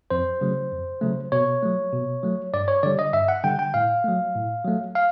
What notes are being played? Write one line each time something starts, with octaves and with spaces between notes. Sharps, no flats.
F2 C5
C#3 F#3 A3
F2
C#3 F#3 A3
B2 C#5
F#3 A3
B2
F#3 A3
G2 D5
C#5
D3 G3 D5
D#5
G2 E5
F#5
D3 G3 G5
G5
A2 F5
F#3 A3
A2
F#3 A3
F5